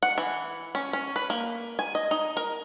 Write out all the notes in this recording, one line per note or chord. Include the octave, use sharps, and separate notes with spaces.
F#5
E3
C#4
C#4
B4
A#3
G#5
D#5
D#4
A#4